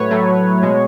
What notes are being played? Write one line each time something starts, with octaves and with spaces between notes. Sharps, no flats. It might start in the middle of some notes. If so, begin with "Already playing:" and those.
Already playing: A2 F#3 A3 B4 C#5
A2 F#3 A3
B2 G#3